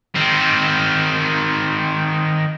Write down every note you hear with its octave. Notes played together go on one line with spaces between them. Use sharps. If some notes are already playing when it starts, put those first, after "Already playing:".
D#3 C4